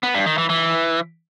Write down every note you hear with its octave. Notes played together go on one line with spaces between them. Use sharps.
B3
G2
D#3
E3
E3